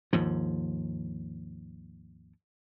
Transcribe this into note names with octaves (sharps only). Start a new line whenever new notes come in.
D#2 G#2 F3